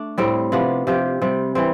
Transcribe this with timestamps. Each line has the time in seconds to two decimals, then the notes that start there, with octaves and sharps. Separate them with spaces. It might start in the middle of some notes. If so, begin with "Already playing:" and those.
Already playing: A3 D4
0.18 A2 G3 C4
0.52 C3 F3 B3 D4
0.87 C3 F3 C4 G4
1.22 C3 G3 C4
1.55 E3 G3 C4